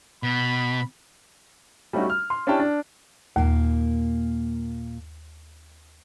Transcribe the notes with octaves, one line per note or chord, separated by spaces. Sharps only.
B2 B5
G3 A3 C#4 D#4 F#4
F6
C6
C#4 D4 E4 G4 G5 A5
D4
D#2 A#2 A#3